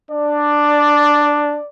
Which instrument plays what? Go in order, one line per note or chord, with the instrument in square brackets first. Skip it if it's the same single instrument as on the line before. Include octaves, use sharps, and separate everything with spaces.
[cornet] D4 [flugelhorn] D5